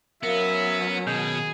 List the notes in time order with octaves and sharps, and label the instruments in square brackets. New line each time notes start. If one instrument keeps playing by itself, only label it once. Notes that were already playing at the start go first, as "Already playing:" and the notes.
[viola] F#3 C#4 [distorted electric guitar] B3 [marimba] A#4 F5 [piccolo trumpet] E5
[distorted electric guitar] B2 [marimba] D#3 [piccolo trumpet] G#4